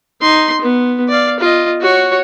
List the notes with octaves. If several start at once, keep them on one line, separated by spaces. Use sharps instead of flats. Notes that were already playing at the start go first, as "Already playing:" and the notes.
D#4 C6
B3
D5 F5
F4 D#5
F#4 C#5